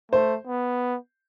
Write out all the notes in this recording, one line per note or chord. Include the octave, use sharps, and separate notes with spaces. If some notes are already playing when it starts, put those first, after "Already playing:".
A3 C5
B3